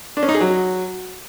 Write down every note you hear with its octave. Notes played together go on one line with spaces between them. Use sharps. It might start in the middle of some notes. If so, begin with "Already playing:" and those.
D4
C#4
D#4
G#4
F#3